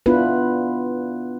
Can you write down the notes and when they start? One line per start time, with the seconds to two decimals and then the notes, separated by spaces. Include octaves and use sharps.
0.06 B3 D4 E4 F4 B4